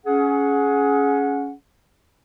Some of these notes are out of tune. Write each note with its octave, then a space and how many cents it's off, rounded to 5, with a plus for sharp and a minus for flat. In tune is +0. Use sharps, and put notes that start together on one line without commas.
C#4 +10 G#4 +20 F#5 -15